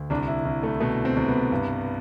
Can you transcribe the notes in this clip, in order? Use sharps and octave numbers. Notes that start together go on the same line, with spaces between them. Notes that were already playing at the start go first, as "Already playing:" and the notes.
Already playing: D2
C2 D4
E4
C2
A3
B2 A3
C4
C2
B3
G2